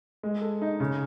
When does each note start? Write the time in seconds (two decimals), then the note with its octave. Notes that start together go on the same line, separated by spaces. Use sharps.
0.23 G#3
0.41 A4
0.62 D#4
0.80 C#3